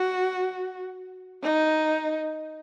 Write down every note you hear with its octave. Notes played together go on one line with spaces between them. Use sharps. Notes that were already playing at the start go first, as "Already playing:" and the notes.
Already playing: F#4
D#4